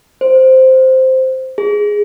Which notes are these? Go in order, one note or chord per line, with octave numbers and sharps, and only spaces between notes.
C5
G#4